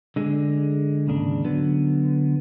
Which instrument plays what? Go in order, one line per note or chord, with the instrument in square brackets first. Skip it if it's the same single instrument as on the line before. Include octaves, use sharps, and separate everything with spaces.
[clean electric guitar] D3 G#3
D#2 G#2 C#3 D4
D3 F#3 B3